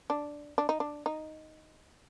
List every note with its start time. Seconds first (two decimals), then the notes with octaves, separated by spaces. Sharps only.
0.10 D4
0.58 D4
0.69 D#4
0.80 D4
1.06 D#4